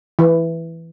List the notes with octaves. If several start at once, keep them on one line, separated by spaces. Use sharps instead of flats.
E3